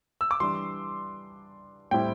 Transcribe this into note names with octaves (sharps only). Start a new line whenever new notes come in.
E6
D6
E3 G3 D4 C6
A2 G3 C4 E4 G5